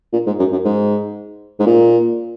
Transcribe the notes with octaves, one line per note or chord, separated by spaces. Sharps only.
A#2
G#2
F#2
F#2
G#2
G#2
A#2